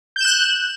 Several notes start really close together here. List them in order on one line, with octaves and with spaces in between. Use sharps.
G6 E7 F#6